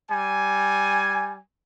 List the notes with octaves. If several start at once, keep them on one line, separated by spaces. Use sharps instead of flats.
G3 G#5